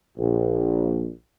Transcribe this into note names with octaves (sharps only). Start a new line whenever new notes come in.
A#1